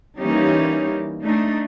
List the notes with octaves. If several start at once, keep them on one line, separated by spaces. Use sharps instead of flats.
E3 G3 A#3 C#4 D#4 G4
A3 D4 D#4